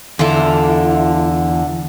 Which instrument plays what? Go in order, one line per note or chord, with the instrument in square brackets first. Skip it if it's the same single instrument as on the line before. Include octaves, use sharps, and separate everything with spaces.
[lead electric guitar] E2 E4 [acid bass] D3 [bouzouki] F4 A4